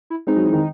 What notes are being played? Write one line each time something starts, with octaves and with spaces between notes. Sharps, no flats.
E4
G#3 C4 D#4
F#3
E3
D#3